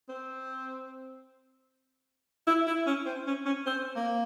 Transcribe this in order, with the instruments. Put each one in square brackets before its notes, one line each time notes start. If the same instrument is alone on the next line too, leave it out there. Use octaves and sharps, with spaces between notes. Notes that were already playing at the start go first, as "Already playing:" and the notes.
[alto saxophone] C4
E4
E4
C#4
C4
C#4
C#4
C4
A#3